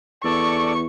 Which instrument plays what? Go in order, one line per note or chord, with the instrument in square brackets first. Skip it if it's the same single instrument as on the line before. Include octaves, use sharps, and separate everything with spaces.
[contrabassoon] E2 [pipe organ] A4 D5 [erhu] C#6